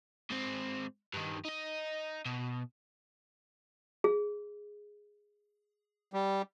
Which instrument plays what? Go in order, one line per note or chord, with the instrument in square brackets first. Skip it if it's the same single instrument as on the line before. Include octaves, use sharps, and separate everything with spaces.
[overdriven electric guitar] G#2 C4
G2 D#3
D#4 D#5
B2
[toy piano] G#4
[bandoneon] G3